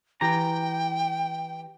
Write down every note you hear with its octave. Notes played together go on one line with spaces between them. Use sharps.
E3 G4 G5 A#5